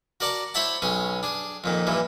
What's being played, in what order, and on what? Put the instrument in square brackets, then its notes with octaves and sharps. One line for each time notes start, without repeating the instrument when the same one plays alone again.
[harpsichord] F#4 A#4 D5 F#5 A5 A#5
E4 C5 C#5 E5 F#5 A5
B1 C#4 G#4
D4 G#4
F2 A#2 D#3
G2 A#2 E3